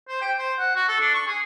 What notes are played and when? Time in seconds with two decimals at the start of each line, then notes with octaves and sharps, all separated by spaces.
0.08 C5
0.21 G5
0.39 C5
0.59 F#5
0.76 F#4
0.88 A4
1.01 D4
1.14 C#6
1.27 G#4